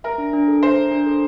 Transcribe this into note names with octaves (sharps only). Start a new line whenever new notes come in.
A#4 E5
D4
D4
A4
C5 E5
D4
D4
A4